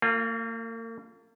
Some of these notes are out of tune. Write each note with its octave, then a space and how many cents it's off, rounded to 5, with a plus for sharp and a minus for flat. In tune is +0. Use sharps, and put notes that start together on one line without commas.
A#3 -40 F4 +0